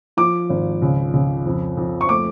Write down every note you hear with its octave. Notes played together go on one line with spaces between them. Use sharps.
F3 D6
G#1
C#2
C#2
F2
F2
C#6
A3 D6